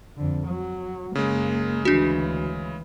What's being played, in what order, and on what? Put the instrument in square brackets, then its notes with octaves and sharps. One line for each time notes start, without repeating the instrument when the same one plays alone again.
[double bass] F2 D3
F#3
[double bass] F#1 A#3 [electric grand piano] C#3 G#3
[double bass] D2 E3 [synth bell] D4 F#4